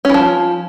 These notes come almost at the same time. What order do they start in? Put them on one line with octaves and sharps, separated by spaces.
C#4 E3 F3